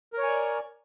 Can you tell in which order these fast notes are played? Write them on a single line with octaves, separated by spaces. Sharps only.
A#4 C#5 G#5 D5